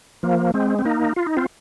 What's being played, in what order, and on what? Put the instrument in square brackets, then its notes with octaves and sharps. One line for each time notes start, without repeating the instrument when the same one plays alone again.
[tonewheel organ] F3 A#3
G#3 C4
C4
A#3 D#4
F4
D#4
C4 F4